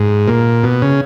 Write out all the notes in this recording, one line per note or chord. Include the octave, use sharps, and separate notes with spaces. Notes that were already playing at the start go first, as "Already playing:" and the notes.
Already playing: G#2
A#2
B2
C#3